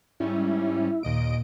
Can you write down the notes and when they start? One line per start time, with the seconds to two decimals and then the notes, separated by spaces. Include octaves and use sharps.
0.20 G#2 G3 C#4 E4
1.03 D#2 A#2 D#5 D7